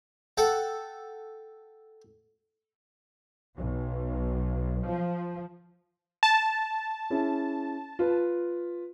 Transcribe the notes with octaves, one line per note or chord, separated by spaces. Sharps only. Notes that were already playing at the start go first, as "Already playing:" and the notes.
A4 F#5 G5
B1
F3
A5
C#4 E4 G#4
F4 B4